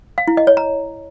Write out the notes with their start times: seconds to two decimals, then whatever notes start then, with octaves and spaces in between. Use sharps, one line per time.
0.18 F5
0.28 E4
0.37 D#5
0.47 C#5
0.57 A#5